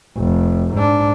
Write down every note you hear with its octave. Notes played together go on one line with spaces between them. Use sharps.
F1
G#2 D4